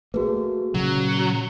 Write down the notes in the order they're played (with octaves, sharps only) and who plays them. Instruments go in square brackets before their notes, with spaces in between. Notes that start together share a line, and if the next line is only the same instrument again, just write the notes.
[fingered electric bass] A3 A#3 [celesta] F#4 G#4 B4
[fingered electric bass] A#2 C#3 [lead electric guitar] F#3
[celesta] C#7 G7